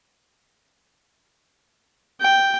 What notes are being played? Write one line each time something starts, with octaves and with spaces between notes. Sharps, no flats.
G5